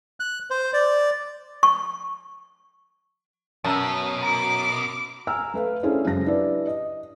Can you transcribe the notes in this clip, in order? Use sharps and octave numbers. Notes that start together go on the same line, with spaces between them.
F#6
C5
D5
C#6
F#2 B2 A5 A#5 E6
A#5 D6
G#5 A#5 E6 F6
A3 B4 F5
C#4 D4 E4 G#4 A4 C5
F#2 C#3 G#3 F5 A5 A#6
D4 E4 G4 B4 D5
D#5